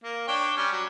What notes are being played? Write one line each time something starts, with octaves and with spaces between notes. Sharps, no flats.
A#3
D4 C#5 G5
G3 C#4
F#3